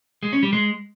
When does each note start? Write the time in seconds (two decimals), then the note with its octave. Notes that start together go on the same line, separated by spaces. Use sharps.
0.23 G#3
0.33 C#4
0.43 G3
0.53 G#3